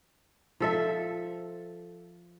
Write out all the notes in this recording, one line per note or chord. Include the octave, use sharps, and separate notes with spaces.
F3 A4 E5